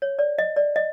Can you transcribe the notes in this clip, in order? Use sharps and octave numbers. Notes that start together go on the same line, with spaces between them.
C#5
D5
D#5
D5
D#5